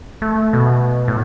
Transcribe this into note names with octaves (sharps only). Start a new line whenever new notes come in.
A3
B2
A2